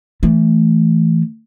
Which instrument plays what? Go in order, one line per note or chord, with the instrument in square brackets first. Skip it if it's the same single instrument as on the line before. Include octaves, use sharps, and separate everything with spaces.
[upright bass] E3 A3